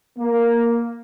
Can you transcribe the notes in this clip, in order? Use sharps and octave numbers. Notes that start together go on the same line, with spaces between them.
A#3